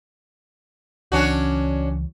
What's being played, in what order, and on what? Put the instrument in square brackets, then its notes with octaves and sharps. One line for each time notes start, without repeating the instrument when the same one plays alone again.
[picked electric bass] C#2 E3 F#3 [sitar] C#4 D4 F#4